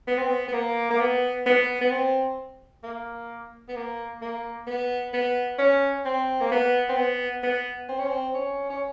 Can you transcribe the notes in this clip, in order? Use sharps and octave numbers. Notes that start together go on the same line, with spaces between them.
B3
C4
B3
B3
A#3
A#3
B3
B3
B3
C4
A#3
B3
A#3
A#3
B3
B3
C#4
C4
A#3
B3
C4
B3
B3
C4
C#4
C4
C#4
C#4